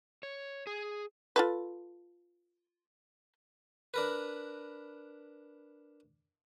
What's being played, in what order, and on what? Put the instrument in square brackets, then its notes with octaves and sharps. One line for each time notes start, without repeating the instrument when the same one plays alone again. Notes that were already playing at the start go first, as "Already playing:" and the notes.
[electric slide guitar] C#5
G#4
[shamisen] F4 A4 B4
[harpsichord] D4 A#4 B4